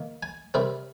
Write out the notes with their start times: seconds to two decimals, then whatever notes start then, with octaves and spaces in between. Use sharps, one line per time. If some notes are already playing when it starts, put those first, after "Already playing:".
Already playing: D#3 A#3
0.23 G#5
0.54 C3 G3 C4 A#4